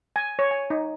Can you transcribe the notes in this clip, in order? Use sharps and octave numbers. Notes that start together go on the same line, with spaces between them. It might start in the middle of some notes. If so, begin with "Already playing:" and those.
G#5
C#5
G#5
D#4